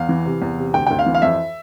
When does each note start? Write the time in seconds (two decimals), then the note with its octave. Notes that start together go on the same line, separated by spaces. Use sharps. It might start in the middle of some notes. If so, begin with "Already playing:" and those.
Already playing: E2 F5
0.09 E3
0.25 C3
0.42 E2
0.58 C3
0.74 D2 G5
0.87 D2 G5
0.99 F5
1.06 E3
1.15 F5
1.22 F2 E5